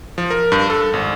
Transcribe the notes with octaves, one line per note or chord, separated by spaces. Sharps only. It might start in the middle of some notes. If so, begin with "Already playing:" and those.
F3
A#4
G2
A4
G#1